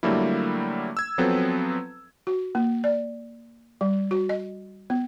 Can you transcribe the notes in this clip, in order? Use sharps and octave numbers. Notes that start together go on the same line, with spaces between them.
D3 F#3 G3 A3 A#3 E4
E6 G#6
F3 F#3 B3 C4 A4 B4
F#4
A#3
D5
G3
F#4
D#5
B3